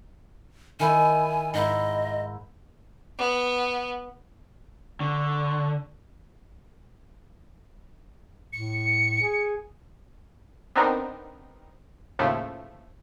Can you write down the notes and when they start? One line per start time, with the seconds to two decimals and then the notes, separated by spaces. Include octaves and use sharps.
0.80 D#3 E4 G#5
1.54 G#2 E4 D#5
3.18 B3
5.00 D3 C#6
8.53 A2 C#7
9.22 G#4
10.75 B3 C4 D4 D#4 A#4
12.19 D#2 A2 C#3 F3 A3